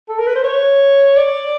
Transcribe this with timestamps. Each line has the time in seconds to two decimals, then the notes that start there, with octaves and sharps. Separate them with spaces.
0.09 A4
0.19 A#4
0.27 B4
0.36 C5
0.44 C#5
1.17 D5